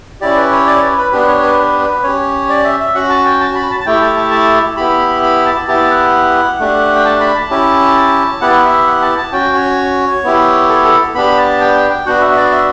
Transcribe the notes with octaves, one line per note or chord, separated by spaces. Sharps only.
C#4 E4 G4 D5
B4
C#5
D5
C#5
B4
B4
B3 D4 G4 B4
C#5
B4
B4
B4
C#4 G4 C#5
D5
E5
E5
C#4 F#4 F#5
A5
G5
A5
B5
A5
A5
A3 E4 G4 G5
A5
A5
A5
B3 E4 G4 B5
B5
A5
B3 E4 G4 A5
F#5
A3 D4 G4
G5
A5
B5
A5
C#4 E4 G4
B3 E4 G4 F#5
E5
F#5
A5
A5
C#4 F#4 G5
C#5
B3 E4 G4
A4
A4
B3 D4 G4 B5
A5
G5
G5
G5
B3 D4 F#4 F#5
E5
E5
D5
E5